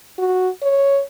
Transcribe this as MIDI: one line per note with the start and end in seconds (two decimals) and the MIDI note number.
0.18 0.49 66
0.62 1.01 73